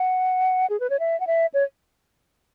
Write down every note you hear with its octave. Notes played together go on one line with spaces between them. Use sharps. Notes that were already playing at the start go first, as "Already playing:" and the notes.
Already playing: F#5
G#4
B4
C#5
E5
F#5
E5
C#5